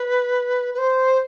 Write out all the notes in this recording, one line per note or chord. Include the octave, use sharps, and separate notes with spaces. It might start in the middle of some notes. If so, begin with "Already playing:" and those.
Already playing: B4
B4
C5